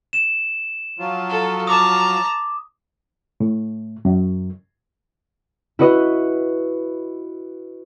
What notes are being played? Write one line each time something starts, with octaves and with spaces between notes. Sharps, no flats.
E7
F3 F#3 F4
A4
A5 A#5 D6 D#6
A2
F#2
E4 F#4 B4 D#5